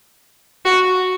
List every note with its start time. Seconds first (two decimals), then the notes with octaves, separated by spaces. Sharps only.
0.65 F#4